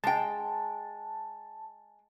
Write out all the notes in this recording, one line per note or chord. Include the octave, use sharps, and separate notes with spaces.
G#3 G5 A5